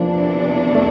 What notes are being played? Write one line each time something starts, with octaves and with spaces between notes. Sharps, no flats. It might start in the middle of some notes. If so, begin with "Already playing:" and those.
Already playing: E2 C3 E3 F3 A#3 D4
A3